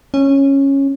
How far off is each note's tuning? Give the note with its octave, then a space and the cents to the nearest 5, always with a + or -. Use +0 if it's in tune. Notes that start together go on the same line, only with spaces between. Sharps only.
C#4 -10